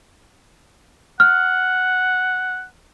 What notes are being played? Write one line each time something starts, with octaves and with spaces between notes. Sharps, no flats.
F#5 F6